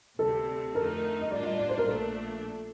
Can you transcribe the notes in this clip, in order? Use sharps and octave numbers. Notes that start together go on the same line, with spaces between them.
D2 C3 G3 C4 A4
F2 D3 A3 D#4 A#4
D#5
A2 G3 A#3 D4 F4 D5
D#5
D5
C5
A#4
A#1 A#2 A3 D4 A4